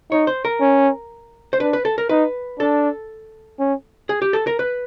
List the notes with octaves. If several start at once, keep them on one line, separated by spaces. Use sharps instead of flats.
D#4 C#5
C5
A#4
C#4
C5
D4 B4
B4
A4
A#4
D#4 B4
D4 A4
C#4
G#4
G4
A4
A#4
B4